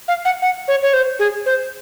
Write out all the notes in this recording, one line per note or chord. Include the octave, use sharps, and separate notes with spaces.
F5
F#5
F#5
C#5
C#5
C5
G#4
C5